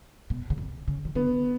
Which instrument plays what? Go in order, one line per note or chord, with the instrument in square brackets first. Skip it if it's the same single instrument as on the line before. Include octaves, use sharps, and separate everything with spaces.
[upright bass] B2
C#3
C3
C#3
D#3
[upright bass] D3 [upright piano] B3